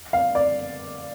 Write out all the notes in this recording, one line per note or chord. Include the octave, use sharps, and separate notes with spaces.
F5
D5